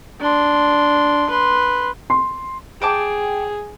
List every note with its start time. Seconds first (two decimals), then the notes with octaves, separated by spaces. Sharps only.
0.21 D4 C6
1.29 B4 C6
2.10 C6
2.82 G#4 G5 A5 D6